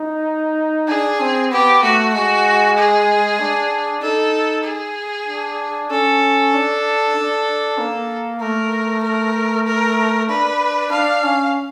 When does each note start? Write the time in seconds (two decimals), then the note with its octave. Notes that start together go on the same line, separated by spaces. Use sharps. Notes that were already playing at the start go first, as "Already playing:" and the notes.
Already playing: D#4
0.88 D4 G#4
1.20 C4
1.51 B3 G4
1.82 A3 F#4
2.13 G#3 F#4
2.77 G#4
3.39 D4
4.02 D#4 A4
4.64 G#4
5.27 D4
5.90 C#4 A4
6.53 D4
7.15 D4
7.78 A#3
8.41 A3 A#4
9.03 A#4
9.66 A#4
10.29 D4 B4
10.92 D4 F5
11.23 C#4